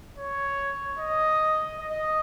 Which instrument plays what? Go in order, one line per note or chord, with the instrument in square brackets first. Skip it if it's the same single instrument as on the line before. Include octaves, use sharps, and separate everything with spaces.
[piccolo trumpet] C#5
D#5
D#5